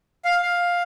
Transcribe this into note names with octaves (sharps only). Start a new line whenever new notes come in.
F5
F5